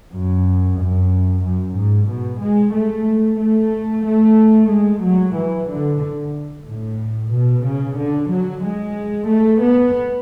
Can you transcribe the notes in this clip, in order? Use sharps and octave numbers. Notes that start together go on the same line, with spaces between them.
F#2
F#2
F#2
G#2
B2
G#3
A3
A3
A3
G#3
F#3
E3
D3
A2
B2
C#3
D3
F#3
G#3
A3
B3